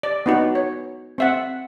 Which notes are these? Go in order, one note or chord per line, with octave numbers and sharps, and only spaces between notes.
D5
B3 D#4 F#4
C#5
C4 E5 F#5